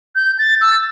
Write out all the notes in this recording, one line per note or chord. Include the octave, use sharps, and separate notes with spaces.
G6
A6
E6